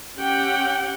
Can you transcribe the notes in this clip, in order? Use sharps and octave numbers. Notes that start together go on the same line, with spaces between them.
C#4 G4 F#5 G5